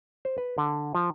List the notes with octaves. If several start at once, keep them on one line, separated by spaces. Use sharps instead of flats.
C5
B4
D3
F3